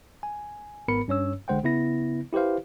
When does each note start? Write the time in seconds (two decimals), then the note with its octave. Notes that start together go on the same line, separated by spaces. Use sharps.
0.23 G#5
0.88 G#1 G#2 B3 A#4 B5 C#7
1.08 G2 C#4 C#5 E6
1.48 A1 D3 G#3 C5 F#5 G5
1.63 C#3 B3 E4 A#6
2.33 E4 G4 B4 C5 F5